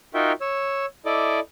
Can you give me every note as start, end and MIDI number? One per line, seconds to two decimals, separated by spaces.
0.14 0.32 63
0.14 0.32 65
0.14 0.32 66
0.14 0.32 70
0.14 0.32 76
0.14 0.32 79
0.41 0.86 73
0.41 0.86 88
1.06 1.40 64
1.06 1.40 69
1.06 1.40 74
1.06 1.40 75
1.06 1.40 86